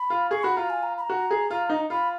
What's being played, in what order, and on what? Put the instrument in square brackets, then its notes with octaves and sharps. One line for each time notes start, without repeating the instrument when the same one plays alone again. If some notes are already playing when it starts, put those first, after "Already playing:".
Already playing: [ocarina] B5
[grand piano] F4
[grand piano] G#4 [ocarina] C#6
[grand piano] F#4 [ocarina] B5
[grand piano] F4 [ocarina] A#5
[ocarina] G#5
A#5
B5
A#5
[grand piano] F#4
G#4
F4
D#4
[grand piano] F4 [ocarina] B5